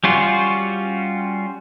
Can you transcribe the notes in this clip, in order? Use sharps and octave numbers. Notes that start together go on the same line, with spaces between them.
G3 C#4 F4 F#4